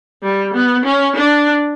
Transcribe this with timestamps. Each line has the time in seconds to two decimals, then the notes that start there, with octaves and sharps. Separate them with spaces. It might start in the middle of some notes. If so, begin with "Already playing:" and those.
0.23 G3
0.55 B3
0.86 C#4
1.16 D4